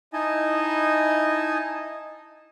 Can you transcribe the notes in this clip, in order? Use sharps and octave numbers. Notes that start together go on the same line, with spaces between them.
D#4 E4 D#5 G#5 A5